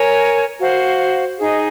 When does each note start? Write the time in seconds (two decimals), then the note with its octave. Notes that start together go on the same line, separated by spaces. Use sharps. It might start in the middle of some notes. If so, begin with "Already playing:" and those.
Already playing: A#4 C#5 G#5
0.61 F#4 C5 F5
1.39 D#4 G#4 D#5